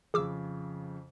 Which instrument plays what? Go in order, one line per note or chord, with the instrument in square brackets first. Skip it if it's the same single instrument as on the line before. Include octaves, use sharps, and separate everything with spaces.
[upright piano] F2 C#3 [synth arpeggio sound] G#4 D6 E6